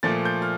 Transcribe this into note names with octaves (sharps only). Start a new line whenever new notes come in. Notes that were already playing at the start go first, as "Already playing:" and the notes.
A#2 F3 A3 A6
G6
F6